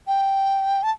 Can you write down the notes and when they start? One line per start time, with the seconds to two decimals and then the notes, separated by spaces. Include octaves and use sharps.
0.07 G5
0.83 A5